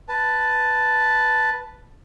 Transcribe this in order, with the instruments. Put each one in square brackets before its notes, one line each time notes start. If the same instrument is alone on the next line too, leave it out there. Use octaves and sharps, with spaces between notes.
[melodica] B4 A5